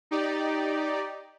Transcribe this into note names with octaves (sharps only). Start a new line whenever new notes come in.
D#4 G4 D5